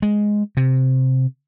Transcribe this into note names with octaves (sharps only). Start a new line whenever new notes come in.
G#3
C3